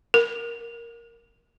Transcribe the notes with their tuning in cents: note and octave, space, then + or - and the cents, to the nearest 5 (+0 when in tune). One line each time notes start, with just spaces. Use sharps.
A#4 +0